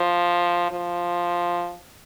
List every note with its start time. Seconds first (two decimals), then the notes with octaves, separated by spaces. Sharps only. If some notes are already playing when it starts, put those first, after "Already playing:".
Already playing: F3
0.72 F3